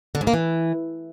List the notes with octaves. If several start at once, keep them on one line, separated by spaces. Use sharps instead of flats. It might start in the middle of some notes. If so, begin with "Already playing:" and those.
D3
G#2
A#3
E3